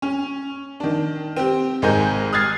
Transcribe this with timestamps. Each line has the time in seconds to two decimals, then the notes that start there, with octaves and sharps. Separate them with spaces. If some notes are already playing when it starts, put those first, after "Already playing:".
0.02 C#4
0.80 D#3 D4
1.36 C4 G4
1.82 G#1 G#2 G#3 A#4 G#5 G6
2.33 D#6 F6 F#6 G#6 A6 C7